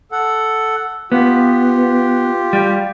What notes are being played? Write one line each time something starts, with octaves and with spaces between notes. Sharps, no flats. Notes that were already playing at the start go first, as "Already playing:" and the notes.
A4 F#5
B3 F4 G4
G3